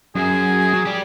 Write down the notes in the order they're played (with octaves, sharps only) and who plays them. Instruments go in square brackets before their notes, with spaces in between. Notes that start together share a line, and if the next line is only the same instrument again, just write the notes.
[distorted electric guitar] F#2 [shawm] G#4
[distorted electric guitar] F#3
G4 D5